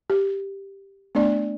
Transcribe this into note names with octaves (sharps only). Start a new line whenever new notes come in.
G4
A3 B3 D4 D5